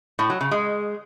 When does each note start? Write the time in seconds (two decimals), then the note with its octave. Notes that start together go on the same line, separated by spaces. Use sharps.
0.19 A2
0.30 F#3
0.41 C#3
0.51 G#3